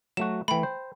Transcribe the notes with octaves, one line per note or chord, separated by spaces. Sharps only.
F#3 A3 F#4 E7
E3 A3 G5 B5
C5